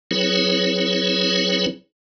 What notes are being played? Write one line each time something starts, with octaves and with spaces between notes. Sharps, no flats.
F#3 C4 E4 G#4 B4 C#5